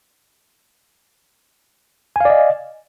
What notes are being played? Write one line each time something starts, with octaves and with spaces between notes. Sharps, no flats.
D5 D#5 F5 G#5